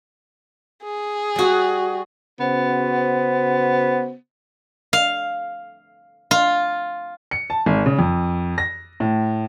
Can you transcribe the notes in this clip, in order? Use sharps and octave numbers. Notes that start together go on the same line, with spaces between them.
G#4
G3 F#4
C#3 B3 F#4 C5
F5
F4
C#7
A5
G#1
C#3
F2
A#6
A2